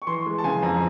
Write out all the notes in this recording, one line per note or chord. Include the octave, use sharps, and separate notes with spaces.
C#6
E3 C6
G#3
A5
C#3 G#5
F2 A#5